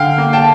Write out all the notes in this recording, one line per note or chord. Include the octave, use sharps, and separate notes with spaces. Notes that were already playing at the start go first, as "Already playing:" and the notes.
Already playing: D3 F5 G5
A#3
G5 A5